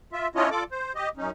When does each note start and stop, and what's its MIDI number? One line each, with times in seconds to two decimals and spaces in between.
0.13 0.28 65
0.13 0.28 76
0.35 0.49 61
0.35 0.49 62
0.35 0.49 64
0.35 0.49 65
0.35 0.49 73
0.35 0.49 75
0.50 0.64 65
0.50 0.64 69
0.50 0.64 74
0.50 0.64 86
0.72 0.92 72
0.95 1.09 67
0.95 1.09 75
1.17 1.31 42
1.17 1.31 61
1.17 1.31 63